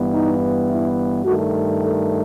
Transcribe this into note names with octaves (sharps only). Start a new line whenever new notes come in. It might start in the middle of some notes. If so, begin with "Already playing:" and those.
Already playing: G2 E3 B3
D#4
E4
G2 D#3 A3 F#4
A4